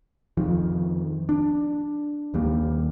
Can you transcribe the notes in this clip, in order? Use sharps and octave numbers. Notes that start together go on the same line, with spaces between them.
F2 D#3 F3
D4
D#2 G3 A#3